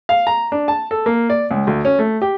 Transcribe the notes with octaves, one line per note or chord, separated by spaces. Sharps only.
F5
A#5
D4
A5
A4
A#3
D5
C#2
D2
C#4
A3
G4